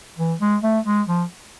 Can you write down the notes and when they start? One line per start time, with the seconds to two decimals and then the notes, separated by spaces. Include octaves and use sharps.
0.18 E3
0.40 G#3
0.63 A3
0.86 G#3
1.08 F3